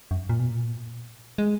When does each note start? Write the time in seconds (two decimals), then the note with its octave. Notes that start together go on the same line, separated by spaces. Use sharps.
0.11 F#2
0.29 A#2
0.39 B2
0.50 A#2
1.38 G#3